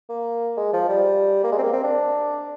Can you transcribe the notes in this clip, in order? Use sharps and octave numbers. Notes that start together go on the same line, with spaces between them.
A#3
G#3
F3
G3
A#3
G#3
C4
A#3
C4
D4